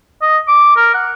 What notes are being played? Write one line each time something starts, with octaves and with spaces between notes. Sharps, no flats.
D#5
D6
A#4
F#5